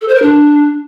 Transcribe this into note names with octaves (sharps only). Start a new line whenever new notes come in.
A4
C5
A#4
D4